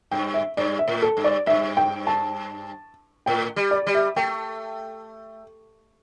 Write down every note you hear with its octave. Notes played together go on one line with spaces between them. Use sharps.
G2 G5
E5
G2 D5
E5
A2
A4
G2
D5
G2 E5
G5
A5
A2 G5
G3
D5
G3
E5
A3 G5